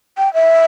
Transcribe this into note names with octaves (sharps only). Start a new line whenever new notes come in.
G5
E5